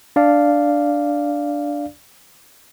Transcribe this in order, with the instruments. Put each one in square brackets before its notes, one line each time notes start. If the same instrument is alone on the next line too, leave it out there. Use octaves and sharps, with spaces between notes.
[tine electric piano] D4 D5 F5